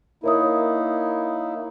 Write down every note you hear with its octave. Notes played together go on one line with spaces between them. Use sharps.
A#3 D#4 E4 A#4 C#5 D#6